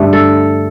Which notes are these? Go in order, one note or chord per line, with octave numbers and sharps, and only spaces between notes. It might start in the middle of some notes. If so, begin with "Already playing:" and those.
Already playing: G2 D3 A3
A4